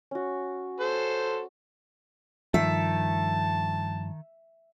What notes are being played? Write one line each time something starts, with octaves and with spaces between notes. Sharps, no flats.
C#4 F#4
A4 C5
G2 D#3 F3 E5 A5